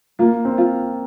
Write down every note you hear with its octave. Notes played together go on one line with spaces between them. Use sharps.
A#3 F4
C4
F4